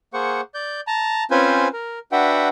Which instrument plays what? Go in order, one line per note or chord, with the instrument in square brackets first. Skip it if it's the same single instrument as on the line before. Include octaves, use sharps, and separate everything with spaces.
[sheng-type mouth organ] A#3 G#4 C5 F#5 C#6
D5 G6
A5 A#5
C4 C#4 F4 B4 C5 G#5
A#4
D4 F#4 B4 E5 F#5 G5